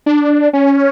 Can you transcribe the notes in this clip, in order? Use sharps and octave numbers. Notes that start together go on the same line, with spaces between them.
D4
C#4